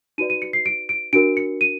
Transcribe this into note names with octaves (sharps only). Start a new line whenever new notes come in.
D#4 F#4 B4 D5 D#7
D#7
C#7
C7
D7
D7
D4 F#4 A#4 D7
C#7
D#7